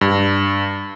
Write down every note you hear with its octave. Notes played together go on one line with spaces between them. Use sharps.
G2